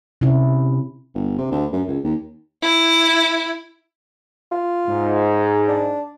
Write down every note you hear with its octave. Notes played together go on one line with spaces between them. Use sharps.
C3 C#4 E4
G1
C3
D2
F#2
C#2
D#2
E4
F4
G#2
D4